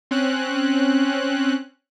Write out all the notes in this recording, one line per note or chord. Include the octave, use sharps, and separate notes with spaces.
C4 C#4 F#6